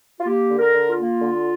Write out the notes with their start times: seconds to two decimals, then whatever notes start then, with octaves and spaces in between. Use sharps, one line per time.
0.20 F4
0.26 A#3 G4
0.50 D3
0.59 A#4
0.74 D3
0.90 F4
0.98 A#3
1.21 D3